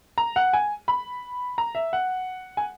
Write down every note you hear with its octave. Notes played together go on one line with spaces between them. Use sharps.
A#5
F#5
G#5
B5
A#5
E5
F#5
G#5